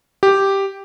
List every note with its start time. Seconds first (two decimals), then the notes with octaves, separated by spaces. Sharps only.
0.23 G4